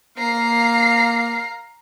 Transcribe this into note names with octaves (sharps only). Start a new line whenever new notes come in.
A#3 F5 A#5 C7